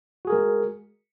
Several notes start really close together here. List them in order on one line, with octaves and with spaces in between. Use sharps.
F#4 G#4 A#4 G#3